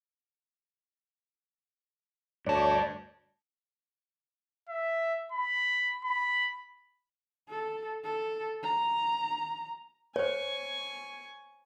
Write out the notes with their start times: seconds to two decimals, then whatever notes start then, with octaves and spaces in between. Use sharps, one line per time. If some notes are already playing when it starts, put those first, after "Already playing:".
2.47 D2 G2 C#5 D5 A5
4.69 E5
5.32 B5
6.04 B5
7.49 A4
8.04 A4
8.63 A#5
10.16 C5 C#5 G#5 C#6